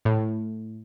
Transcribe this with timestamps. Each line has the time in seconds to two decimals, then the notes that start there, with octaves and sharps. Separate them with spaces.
0.05 A2